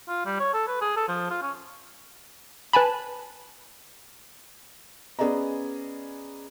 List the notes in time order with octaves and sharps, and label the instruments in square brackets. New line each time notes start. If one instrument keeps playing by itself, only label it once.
[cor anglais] F4
G3
C#5
A4
B4
G#4
A4
F3
F4
C#4
[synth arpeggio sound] B4 G#5 A5 B5
[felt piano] B3 C#4 G#4 D5 D#5 A#5